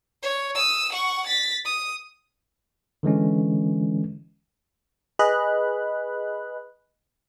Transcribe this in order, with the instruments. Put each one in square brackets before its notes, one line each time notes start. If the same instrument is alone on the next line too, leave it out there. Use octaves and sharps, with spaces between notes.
[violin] C#5
D#6 E6
F#5 C#6
A6 B6
D#6
[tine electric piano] D3 E3 G#3 C#4
[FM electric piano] G#4 B4 D#5 B5 F#6